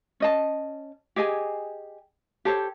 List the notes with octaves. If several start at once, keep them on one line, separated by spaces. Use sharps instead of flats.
C#4 D#5 A5
G4 G#4 D#5 G#5
G4 A4 C5 C#5